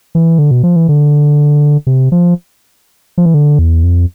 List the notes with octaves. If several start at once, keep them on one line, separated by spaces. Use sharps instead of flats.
E3
D3
B2
F3
E3
D3
C3
F3
F3
E3
D3
E2
F2